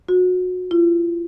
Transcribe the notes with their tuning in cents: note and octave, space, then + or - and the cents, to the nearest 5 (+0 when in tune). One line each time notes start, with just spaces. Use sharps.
F#4 -25
F4 -40